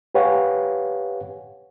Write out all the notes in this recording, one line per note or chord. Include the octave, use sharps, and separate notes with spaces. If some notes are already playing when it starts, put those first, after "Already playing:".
G4 B4 C#5 F5 F#5 G#5